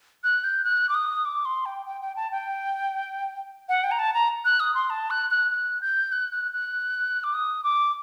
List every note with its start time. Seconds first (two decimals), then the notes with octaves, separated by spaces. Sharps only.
0.24 F#6
0.44 G6
0.64 F#6
0.89 D6
0.94 D#6
1.25 D6
1.45 C6
1.66 G5
1.86 G5
2.01 G5
2.16 A5
2.31 G5
3.69 F#5
3.84 G5
3.91 A#5
3.99 A5
4.14 A#5
4.45 F#6
4.60 D#6
4.75 C6
4.90 A5
5.10 F#6
5.31 F#6
5.51 F#6
5.82 G6
6.12 F#6
6.32 F#6
6.53 F#6
7.24 D6
7.34 D#6
7.64 D6